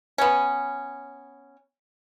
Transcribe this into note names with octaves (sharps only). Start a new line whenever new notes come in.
B3 C#4